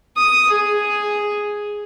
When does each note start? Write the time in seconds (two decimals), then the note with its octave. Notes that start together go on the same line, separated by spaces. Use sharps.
0.17 D#6
0.50 G#4